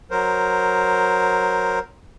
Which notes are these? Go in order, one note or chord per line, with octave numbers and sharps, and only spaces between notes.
F#3 A#4 C5